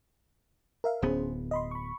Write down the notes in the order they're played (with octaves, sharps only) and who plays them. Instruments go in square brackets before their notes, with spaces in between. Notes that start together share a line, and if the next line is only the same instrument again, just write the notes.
[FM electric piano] A#4 E5 F5
[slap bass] D1 B3 [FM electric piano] C#4 G#4 C5
[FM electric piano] D#5 B5 C6
B5 C#6